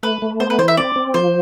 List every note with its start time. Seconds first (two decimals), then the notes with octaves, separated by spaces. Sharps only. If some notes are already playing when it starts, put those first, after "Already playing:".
0.03 A3 B4
0.22 A3
0.40 B3 C5
0.50 B4
0.58 E3 C5
0.68 E5
0.77 C4 D5
0.96 C4
1.14 F3 C5